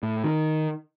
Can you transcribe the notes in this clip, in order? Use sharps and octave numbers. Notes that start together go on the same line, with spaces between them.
A2
D#3